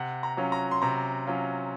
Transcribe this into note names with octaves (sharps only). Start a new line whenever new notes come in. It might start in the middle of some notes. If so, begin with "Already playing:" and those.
Already playing: C3 F#5
A#5
F#3 C#4 F4
A#5
C6
C3 A#5
F#3 C#4 F4